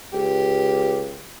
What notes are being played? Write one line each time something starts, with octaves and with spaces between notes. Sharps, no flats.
C#2 G4